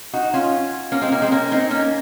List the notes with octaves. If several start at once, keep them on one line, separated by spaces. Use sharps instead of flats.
D#4 F#4
C#4 F4
A#3 C#4
G#3 C4
A#3 C#4
G#3 C4
A#3 C#4
C4 D#4
A#3 C#4